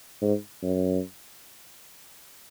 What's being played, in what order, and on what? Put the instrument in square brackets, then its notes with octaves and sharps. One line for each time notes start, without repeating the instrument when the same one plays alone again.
[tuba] G#2
F#2